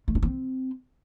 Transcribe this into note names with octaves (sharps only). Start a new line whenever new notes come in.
A3
D4
C4